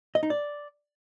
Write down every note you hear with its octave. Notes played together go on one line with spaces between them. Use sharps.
D#5
D#4
D5